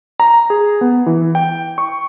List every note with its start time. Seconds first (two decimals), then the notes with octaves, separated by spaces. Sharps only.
0.20 A#5
0.50 G#4
0.81 B3
1.06 E3
1.35 G5
1.78 C#6